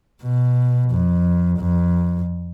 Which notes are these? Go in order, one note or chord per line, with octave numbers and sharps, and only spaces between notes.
B2
F2
F2